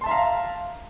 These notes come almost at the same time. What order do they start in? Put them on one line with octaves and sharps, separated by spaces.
C6 A5 E5 A#5 F5